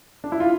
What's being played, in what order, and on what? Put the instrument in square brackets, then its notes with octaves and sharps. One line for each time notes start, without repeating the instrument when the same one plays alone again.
[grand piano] D4
E4
F4